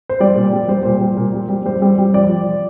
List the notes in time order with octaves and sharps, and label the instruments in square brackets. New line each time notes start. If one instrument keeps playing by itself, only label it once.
[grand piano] C5
G3 D5
A#2
G3
G3 C5
A#2 C5
G3
A#2
G3
G3
G3 C5
G3
G3
F3 D5
F3
F3